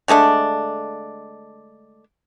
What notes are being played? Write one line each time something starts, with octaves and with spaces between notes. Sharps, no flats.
D3 G#3 A3 D4